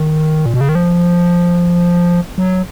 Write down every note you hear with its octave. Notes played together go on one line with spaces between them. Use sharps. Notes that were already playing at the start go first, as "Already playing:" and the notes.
Already playing: D#3
A#2
B2
C#3
D#3
F3
F#3